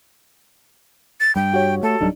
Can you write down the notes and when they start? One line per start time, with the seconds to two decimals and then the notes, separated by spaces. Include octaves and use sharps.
1.20 A6
1.36 G2 G3 G5
1.54 F#4 G4 C#5
1.83 A3 A4
2.01 D1 F#3 G3 D4 D#4